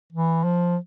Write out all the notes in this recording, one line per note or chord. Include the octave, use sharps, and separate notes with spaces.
E3
F3